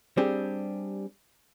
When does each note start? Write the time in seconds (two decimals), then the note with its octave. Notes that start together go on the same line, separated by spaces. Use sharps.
0.17 G3 C4 D4 G4 G#4